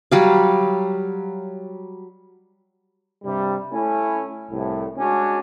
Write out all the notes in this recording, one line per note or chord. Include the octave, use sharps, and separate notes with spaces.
F#3 G3 F5
G2 C3 G3
A3 C#4 E4
C2 A2
G#3 C#4 D4 F#4